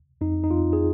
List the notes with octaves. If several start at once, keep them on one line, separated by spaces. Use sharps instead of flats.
F2 D#4
D#4
F2 F4
G#4